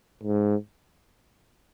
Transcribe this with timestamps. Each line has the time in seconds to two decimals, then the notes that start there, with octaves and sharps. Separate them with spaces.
0.24 G#2